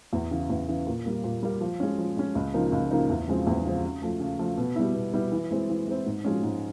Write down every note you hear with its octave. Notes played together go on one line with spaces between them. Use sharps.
E2
C#3 E3
E2
C#3 E3
A#2
G3 A#3
A#2
G3 A#3
F3
G#3 C#4
F3
G#3 C#4
C#2
C#3 F3 A#3 D#4
C#2
C#3 F3 A#3 D#4
E2
C#3 F3 G#3 C4
E2
C#3 F3 G#3 C4
C#3
F3 A3
C#3
F3 A3
B2
G3 B3 E4
B2
G3 B3 E4
E3
G#3 C4 E4
E3
G#3 C4 E4
G#2
F3 G#3 C#4
G#2